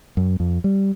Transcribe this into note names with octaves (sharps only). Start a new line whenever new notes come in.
F#2
F2
G3